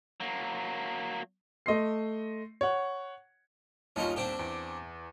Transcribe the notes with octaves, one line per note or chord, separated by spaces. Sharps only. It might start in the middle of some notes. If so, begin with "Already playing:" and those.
F#3 A#3
A3 D#5 C6 C7
C#5 F#5
G1 D#2 C#4 D#4 F4
C4 D4 G4
E2